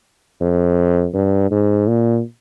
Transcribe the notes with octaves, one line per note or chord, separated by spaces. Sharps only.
F2
G2
G#2
A#2